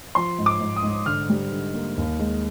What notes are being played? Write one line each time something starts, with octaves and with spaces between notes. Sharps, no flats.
F3 C6
G#2
D6
G#2
D#6
G#2
D3 F6
G3
D3
A#3
D#2
G#3